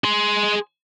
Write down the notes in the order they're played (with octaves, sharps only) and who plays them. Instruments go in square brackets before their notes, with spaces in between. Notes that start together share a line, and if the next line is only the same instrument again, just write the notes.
[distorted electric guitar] G#4 C6